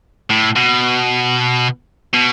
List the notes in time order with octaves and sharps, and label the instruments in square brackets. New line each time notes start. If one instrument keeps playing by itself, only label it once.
[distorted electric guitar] A2
B2
B2